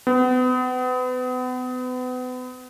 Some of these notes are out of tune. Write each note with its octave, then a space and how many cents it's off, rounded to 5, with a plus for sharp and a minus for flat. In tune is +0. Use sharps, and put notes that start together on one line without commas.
B3 +35